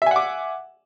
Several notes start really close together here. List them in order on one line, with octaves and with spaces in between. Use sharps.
E5 G#5 F#5 D6